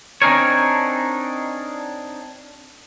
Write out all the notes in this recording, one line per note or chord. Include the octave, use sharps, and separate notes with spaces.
C4 D4 D#4 G#4 A#4 C#5